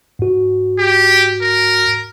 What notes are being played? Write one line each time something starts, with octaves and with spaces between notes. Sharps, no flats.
G#2 F#4
G4
A#4